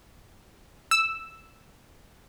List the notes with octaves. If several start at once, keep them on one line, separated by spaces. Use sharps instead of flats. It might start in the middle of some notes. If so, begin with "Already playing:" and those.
E6